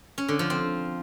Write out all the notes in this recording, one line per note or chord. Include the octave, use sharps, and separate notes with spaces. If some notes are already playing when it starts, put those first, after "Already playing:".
C#4
D3
F3
C4